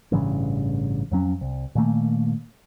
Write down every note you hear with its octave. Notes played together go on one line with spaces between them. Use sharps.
A1 G2 C#3 E3
F2 F#3 C#4
C2
A#2 D#3 A3 A#3